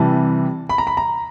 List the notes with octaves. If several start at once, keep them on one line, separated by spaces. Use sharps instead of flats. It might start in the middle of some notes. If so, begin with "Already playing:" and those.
Already playing: C3 E3 G3 A5
B5
A#5
B5
A#5